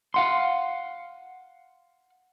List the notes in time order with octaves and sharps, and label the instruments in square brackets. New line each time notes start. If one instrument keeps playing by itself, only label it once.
[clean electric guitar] F5 F#5 C6